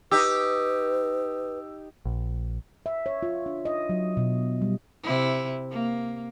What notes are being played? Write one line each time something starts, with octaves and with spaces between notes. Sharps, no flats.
D#4 G4 B4 E6
A#1
E5
C#5
F4
D4
D#5
F#3
B2
G3
C3 E4
A#3